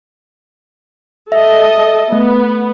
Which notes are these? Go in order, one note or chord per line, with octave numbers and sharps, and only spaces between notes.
A4 D#5 E5
A3 B3